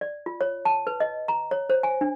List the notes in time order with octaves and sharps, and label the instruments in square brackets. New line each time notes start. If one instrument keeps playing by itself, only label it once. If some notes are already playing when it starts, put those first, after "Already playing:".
[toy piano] D5
F4
C#5
A5
B4
D#5
A#5
C#5
C5
G#5
D4